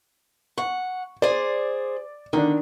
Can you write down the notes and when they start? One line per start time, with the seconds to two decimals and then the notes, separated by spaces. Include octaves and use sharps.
0.58 F#5 C#6
1.22 G#4 C5 D5
2.33 D3 D#3 D4